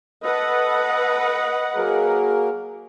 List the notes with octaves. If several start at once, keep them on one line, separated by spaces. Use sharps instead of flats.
A4 B4 D#5 F#5
F#3 A#3 G#4 A#4